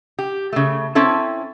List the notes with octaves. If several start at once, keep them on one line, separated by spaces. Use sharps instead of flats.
G4
C#3 A3
C4 C#4 E4 A4